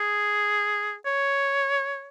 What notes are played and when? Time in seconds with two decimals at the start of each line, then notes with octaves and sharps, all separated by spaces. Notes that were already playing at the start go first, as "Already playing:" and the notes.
Already playing: G#4
1.06 C#5